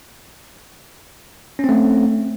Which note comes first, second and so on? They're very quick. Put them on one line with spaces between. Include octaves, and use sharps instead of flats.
C#4 C4 A3